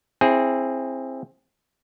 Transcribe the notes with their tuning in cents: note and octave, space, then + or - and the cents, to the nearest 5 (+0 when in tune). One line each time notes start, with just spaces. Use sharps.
C4 +15 E4 +0 G#4 +0